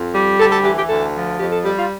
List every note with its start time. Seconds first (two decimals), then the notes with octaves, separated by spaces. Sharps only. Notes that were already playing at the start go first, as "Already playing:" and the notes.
Already playing: F2
0.14 G3
0.39 D2 A4
0.51 A4
0.64 E3 G4
0.77 G4
0.89 D2 A4
1.14 F3
1.40 F2 G4
1.52 A4
1.65 G3 G4
1.78 F4